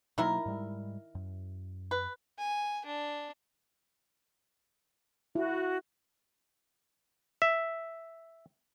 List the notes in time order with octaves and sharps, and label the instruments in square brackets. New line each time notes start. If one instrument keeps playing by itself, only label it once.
[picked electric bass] B2 F#3 A#3 [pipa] D#3 E4 A#4
[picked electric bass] G#2 G3 G#3
F#2
[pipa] B4
[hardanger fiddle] G#5
D4
[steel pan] E4 [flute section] F#4
[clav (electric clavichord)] E5